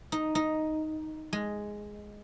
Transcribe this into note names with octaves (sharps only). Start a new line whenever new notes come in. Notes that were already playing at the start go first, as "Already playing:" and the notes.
D#4
D#4
G#3